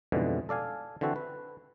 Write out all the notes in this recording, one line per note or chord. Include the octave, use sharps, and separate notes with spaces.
F2 G#2 B2 D3 E3 G3
A4 D5 F5 G#5
D3 E3 C4 F#4 A4
B4